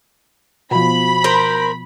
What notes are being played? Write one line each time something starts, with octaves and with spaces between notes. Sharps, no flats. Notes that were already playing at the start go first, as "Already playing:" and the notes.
B2 F3 B5
A#4 C5